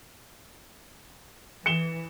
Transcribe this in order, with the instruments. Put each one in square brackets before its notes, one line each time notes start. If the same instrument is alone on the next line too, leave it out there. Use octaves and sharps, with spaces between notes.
[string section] E3 [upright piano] C#7 E7 G7